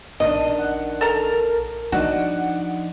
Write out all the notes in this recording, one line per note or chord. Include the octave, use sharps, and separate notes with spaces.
A#1 D#3 C#4 D4 D#5
F#5
A4 A#4 A#5
F3 D4 D#4 F#4 F#5